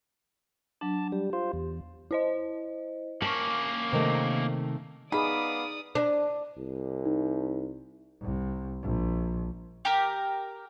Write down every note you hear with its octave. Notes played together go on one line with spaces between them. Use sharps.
F#3 D4 A5
G3 G4
F4 C5
E2
E4 C5 D#5
A#3 C#4 A5 C#6 F6 F#7
C3 D#3 A3
B3 D#4 G#4 D5 F5 B5 D6 D#6
D4
C2
D#4
C2
A#1
G4 A#4